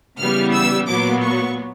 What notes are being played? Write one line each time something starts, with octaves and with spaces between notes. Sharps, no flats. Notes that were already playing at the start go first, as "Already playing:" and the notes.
C#3 E3 G3 B3 F6
E6
A#2 F#3 B3 D6
C#6